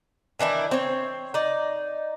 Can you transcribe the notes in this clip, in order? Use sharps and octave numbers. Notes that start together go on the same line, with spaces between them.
D#3 E3 D4 E4
C4 C#5
D#4 D5